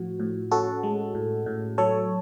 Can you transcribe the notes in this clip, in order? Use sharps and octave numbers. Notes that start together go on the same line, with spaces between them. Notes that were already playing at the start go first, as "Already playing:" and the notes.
Already playing: A2 F3 F#4
A2
C#4 F#4 A4
G#3
A2
A2
F#3 A4 C#5